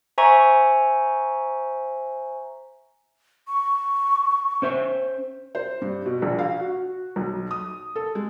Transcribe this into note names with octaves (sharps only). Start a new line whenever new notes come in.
C5 E5 G#5 A#5 C#6
C#6
C#4 C5 E5
C5
G2
B2
A#1
F5
F#4
B1
D#6
A4
G#3